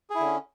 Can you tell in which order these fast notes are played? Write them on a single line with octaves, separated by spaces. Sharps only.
G#4 E4 D3 C#4